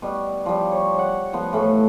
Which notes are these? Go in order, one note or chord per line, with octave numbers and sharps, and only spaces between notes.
B2 G3
F3 G3
C#5
F#5
F3 B3
A2 E3 A3